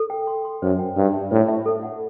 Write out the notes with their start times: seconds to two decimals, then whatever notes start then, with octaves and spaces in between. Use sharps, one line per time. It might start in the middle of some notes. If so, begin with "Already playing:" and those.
Already playing: A4
0.10 G5
0.27 C6
0.45 C6
0.62 F#2 C5
0.79 G5
0.96 G2 B4
1.14 E5
1.31 A2 C5
1.48 E5
1.66 A4
1.83 F#5